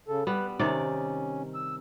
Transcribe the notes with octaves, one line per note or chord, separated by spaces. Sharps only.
C#3 A4
G3 B3 B4
C3 D#3 C#4 D5
E6